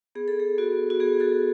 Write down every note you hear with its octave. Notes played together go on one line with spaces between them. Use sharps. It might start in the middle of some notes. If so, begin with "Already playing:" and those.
B3 G#4
A4
G#4
B3 F#4
F#4
B3 G#4
F#4 A4